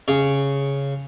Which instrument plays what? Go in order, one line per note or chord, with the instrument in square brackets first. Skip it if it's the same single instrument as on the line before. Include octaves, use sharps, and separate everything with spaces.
[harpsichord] C#3